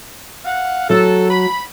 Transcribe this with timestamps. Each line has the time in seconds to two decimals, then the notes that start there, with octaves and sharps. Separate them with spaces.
0.45 F5 F#5
0.90 F#3 A4
1.30 B5